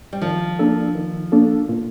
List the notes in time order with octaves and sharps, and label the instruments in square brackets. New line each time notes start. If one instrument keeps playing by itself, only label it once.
[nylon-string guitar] G3
[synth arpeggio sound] D#3 [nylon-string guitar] F3
[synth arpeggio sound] A#3 D4 A4
D#3
A#3 D4 A4
A#2